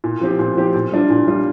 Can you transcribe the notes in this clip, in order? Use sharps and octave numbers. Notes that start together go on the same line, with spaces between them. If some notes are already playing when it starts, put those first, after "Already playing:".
A#2
F3 C4 G4
A#2
F3 C4 G4
A#2
G3 D4 F4
A#2
G3 D4 F4